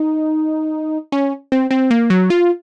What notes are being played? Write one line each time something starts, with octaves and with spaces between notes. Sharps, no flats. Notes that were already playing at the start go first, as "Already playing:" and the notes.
Already playing: D#4
C#4
C4
C4
A#3
F#3
F4